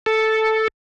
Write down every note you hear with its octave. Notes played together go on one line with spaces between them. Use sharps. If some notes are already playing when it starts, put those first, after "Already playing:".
A4